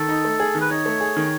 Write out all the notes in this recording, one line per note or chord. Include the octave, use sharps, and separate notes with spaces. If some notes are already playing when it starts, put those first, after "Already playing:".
Already playing: D#3 A4
D#4
A3
G#4
D#3
B4
D#4 C#5
A3
G#4
D#3